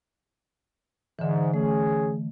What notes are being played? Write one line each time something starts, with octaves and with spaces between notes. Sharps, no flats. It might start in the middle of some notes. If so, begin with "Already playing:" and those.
G#2 D3 E3
A3 C#4 G#4